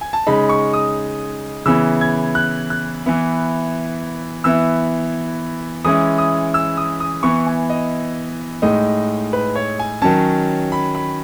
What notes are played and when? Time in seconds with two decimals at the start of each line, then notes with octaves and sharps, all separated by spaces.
0.01 G#5
0.13 A5
0.27 C#3 G#3 D#4 B5
0.49 C#6
0.73 D#6
1.66 C#3 E3 B3 E4 E6
2.01 G#6
2.35 F#6
2.70 F#6
3.06 E3 B3 E4
4.44 E3 B3 E4 E6
5.84 E3 G#3 C#4 E4 D#6
6.18 D#6
6.54 E6
6.77 D#6
7.00 D#6
7.23 E3 B3 E4 C#6
7.46 G#5
7.70 D#5
8.62 A2 G#3 D#4 D#5
9.33 B4
9.56 C#5
9.79 G#5
10.02 D#3 F#3 C#4 A5
10.72 B5
10.95 B5